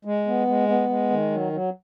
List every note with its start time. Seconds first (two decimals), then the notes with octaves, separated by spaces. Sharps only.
0.05 G#3
0.27 B3
0.47 G#3
0.68 B3
0.89 G#3
1.10 D#3
1.31 F#3
1.52 F#3